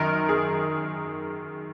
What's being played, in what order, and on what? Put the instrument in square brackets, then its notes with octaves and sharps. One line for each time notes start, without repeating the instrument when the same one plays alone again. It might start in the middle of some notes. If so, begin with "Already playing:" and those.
Already playing: [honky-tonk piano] F#2 D#3 A#4
G#4